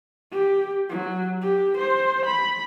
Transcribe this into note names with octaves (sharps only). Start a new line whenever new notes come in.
G4
F#3
G4
C5
B5